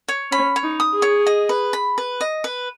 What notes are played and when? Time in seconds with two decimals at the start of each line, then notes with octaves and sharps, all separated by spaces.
0.08 C#5
0.31 C#4 B5
0.56 C#5
0.63 D#4
0.80 D#6
0.94 G#4
1.02 C#5
1.27 D#5
1.49 B4
1.73 B5
1.98 B4
2.21 D#5
2.44 B4